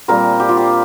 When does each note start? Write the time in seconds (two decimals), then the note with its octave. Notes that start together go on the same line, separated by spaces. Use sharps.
0.08 A#2 G3 C4 A#4
0.40 G4
0.49 F4
0.57 G4